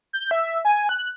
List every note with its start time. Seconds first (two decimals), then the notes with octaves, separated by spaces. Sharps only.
0.13 G6
0.31 E5
0.65 G#5
0.89 F#6